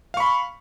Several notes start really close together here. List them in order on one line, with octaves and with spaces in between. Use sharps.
F5 C#6 B5